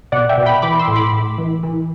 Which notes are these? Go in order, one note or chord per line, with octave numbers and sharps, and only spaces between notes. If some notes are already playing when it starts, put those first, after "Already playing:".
B2 D5 F#5
E5 G5
B2
G5 B5
E3 B5 D6
C6 E6
A2
B5 D6
A2
E3
E3